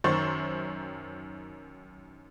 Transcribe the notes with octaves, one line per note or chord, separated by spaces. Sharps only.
F#2 D#3 C5 C#6 A6